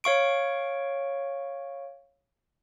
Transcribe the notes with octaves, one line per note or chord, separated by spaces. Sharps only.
C#5 F5 C#6 D7